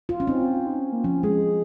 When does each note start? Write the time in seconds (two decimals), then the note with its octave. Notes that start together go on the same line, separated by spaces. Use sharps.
0.09 F4
0.20 C#4
0.27 C4 D#4
0.41 F4
0.54 F4
0.67 D#4
0.79 C#4
0.92 A#3
1.04 F3 C#4
1.23 G#3 G#4